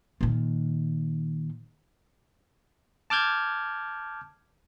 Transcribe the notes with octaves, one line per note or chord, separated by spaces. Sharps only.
A#2 D#3
A5 D6 F6 G6 G#6